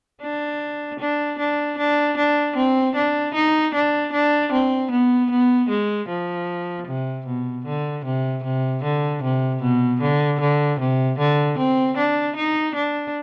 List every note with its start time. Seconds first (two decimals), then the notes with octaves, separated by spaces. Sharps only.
0.21 D4
1.00 D4
1.39 D4
1.78 D4
2.17 D4
2.56 C4
2.95 D4
3.34 D#4
3.74 D4
4.13 D4
4.52 C4
4.91 B3
5.30 B3
5.70 G#3
6.08 F3
6.87 C3
7.27 B2
7.66 D3
8.05 C3
8.44 C3
8.83 D3
9.23 C3
9.62 B2
10.01 D3
10.40 D3
10.80 C3
11.19 D3
11.58 C4
11.97 D4
12.36 D#4
12.75 D4